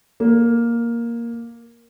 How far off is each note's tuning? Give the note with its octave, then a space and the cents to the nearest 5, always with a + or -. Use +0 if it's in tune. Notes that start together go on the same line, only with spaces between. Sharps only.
A#3 +5